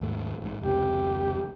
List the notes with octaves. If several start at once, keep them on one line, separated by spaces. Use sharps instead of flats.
D#2 G#2 A3
A1 G#2
F1 C#2 C3 G4